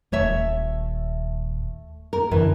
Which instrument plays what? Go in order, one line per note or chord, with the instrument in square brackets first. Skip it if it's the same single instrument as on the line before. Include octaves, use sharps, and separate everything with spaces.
[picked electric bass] D#1 [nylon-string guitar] A3 C#5 E5
[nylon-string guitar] A#4
[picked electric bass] F#2 D3 [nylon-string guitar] E3